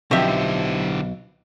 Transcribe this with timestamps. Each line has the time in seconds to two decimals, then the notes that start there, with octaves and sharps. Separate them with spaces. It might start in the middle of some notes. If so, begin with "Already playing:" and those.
0.11 B1 D3 F3 C4 E4 G4 E5